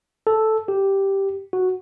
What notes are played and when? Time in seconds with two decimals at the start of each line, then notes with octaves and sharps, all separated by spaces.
0.27 A4
0.68 G4
1.53 F#4